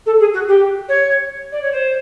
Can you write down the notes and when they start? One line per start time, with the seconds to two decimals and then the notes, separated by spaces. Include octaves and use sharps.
0.05 A4
0.19 G#4
0.33 F#4
0.47 G4
0.88 C#5
1.52 D5
1.61 C#5
1.71 C5